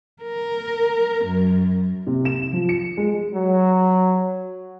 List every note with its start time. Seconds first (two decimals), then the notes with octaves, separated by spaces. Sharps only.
0.23 A#4
1.25 F#2
2.07 C3
2.25 E7
2.53 F3
2.69 C#7
2.97 G#3
3.33 F#3